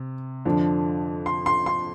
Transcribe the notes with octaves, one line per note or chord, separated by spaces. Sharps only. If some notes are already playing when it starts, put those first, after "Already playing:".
Already playing: C3
F2 D3 F3 D4
C6
C6
C6